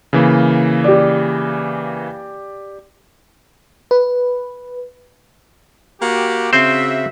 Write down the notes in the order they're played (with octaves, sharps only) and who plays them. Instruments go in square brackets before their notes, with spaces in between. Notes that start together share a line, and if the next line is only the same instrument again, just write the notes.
[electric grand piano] C#3 E3 A#3
[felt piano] G4 D5
[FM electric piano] B4
[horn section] A#3 F#4 G4
[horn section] C#3 F#4 E5 [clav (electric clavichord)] C4 C5